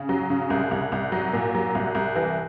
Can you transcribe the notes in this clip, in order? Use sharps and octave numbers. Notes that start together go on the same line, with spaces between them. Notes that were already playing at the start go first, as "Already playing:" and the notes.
Already playing: C#3
F#3
C#3
C2
C2
C2
F#3
A#2
F#3
C2
C2
E3